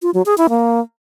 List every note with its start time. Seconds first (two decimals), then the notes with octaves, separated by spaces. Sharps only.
0.02 F4
0.14 F#3
0.26 G#4
0.38 E4
0.50 A#3